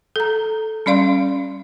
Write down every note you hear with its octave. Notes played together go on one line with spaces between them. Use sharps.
A4 A#5
G3 C#4 D5 F5 C6